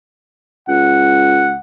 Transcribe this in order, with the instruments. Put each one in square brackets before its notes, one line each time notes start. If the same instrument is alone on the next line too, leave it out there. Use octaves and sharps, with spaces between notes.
[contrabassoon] C#2 [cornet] F#5